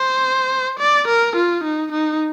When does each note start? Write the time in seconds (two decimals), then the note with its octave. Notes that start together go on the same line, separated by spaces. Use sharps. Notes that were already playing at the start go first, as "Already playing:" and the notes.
Already playing: C5
0.79 D5
1.08 A#4
1.36 F4
1.64 D#4
1.92 D#4